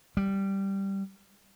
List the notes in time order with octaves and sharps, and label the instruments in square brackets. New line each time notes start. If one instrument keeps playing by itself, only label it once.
[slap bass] G3